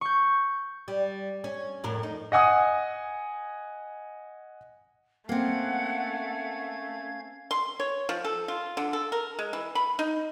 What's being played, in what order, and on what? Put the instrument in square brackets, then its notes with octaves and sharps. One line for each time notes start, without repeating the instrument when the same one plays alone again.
[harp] C#6 G6
[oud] G3
C#4
F2 A2 A#4
D#4
[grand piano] D#5 F#5 G#5 D#6
[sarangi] A3 [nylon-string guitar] A#3 C4 [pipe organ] C#4 F5 G#6 [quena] F#5
[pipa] C6
C#5
F3
A4
F4
D3
A4
A#4
G#3
E3
B5
D#4